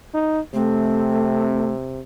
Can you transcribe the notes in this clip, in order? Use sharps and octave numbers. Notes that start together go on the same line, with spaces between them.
D#4
C3 A3 C4